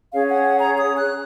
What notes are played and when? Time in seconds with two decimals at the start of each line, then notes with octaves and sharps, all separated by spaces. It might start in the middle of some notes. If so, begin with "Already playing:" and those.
0.12 C#4 G#4 C#5 F5
0.28 F#5
0.44 F#5
0.60 A#5
0.77 D#6
0.98 F#6